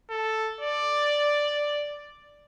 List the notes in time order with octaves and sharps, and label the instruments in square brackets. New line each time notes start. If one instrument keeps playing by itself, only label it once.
[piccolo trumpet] A4
D5